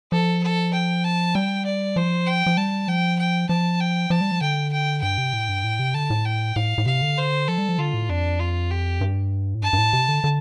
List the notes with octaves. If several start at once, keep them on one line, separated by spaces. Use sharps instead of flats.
F3 A4
A4
G5
A5
G3 G5
D5
F3 C5
G5
F3
G3 A5
F3 G5
G5
F3 A5
G5
F3 A5
G3
F3
D3 G5
G5
G2 G5
C3
A2
G2
A2
C3
D3 A5
A2
G5
A2 F5
A2
C3 F5
D3
C5
F3 A4
G3
F3
D3 F4
A2
F2 D4
F4
G4
G2
A2
G2 A5
G2
A2
C3
D3
D3